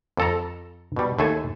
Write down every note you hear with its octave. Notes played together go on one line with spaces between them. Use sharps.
F2 A4 A#5
B2 G3
D#2 A3 A4 G#5